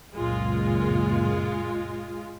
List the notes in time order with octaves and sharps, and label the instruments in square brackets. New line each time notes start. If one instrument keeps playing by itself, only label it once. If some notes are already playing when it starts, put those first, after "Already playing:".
[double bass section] C#2 F#2 A#2 [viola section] G#3 F4